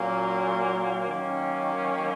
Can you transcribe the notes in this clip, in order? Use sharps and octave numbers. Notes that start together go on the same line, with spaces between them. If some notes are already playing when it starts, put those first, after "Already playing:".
Already playing: A#2 F#3 A#3 C#4
D#3 F#3 A#3 C#4